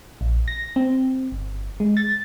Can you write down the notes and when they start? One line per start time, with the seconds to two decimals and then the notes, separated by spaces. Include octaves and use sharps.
0.21 A#1
0.48 A#6
0.76 C4
1.32 G1
1.80 G#3
1.97 A6